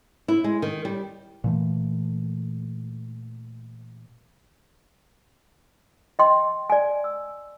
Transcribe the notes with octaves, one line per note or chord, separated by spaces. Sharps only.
E4
G#3
D#3
G3
A#2 E3 A3
D#5 G5 C6
D5 G#5
E6